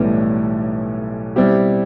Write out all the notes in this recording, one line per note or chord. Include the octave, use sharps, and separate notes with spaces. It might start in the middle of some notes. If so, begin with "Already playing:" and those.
Already playing: B1 A2 E3 G3 B3
B2 G3 C4 E4 G4